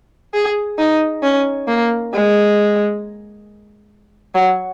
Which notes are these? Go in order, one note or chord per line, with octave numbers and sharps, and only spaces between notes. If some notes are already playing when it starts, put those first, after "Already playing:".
G#4
D#4
C#4
A#3
G#3
F#3